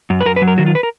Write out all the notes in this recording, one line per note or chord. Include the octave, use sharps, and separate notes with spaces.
F#2
B4
F#2 A#4
B4
F#3
A#4
D#3 F#4
F4
B4
A#4